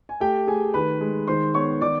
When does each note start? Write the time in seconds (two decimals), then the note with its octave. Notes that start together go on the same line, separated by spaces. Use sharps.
0.09 G#5
0.20 A3 G4 G5
0.47 A3 G#4 G#5
0.74 D#3 B4 B5
1.01 G#3
1.28 D#3 C5 C6
1.54 B3 C#5 C#6
1.81 D#3 D5 D6